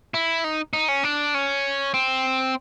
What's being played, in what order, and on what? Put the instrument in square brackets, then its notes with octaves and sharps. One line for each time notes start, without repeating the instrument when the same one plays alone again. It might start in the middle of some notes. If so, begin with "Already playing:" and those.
[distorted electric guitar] E4
D#4
D#4
C#4
D4
C#4
C4